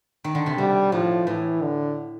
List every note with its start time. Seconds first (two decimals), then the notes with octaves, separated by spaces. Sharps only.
0.24 D#3
0.35 D3
0.46 C3
0.58 B2 G3
0.92 A2 F3
1.27 A2 E3
1.62 D3